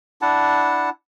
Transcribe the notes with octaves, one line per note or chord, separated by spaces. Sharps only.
D4 E4 F#5 A5